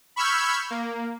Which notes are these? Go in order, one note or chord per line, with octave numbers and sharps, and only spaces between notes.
B5 C#6 E6 F6 G6 G#6
A#3